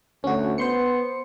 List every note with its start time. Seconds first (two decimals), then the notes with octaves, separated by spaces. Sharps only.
0.24 D2 C#4 F#4
0.58 B3 C5 C6 C#7